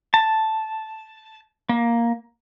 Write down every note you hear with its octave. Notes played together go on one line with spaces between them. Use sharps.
A5
A#3